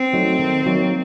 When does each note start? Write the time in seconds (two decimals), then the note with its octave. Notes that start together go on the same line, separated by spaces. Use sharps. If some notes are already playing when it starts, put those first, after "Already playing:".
Already playing: C4
0.13 F#3 A3 D#4
0.39 D#3
0.66 F#3 A#3 D#4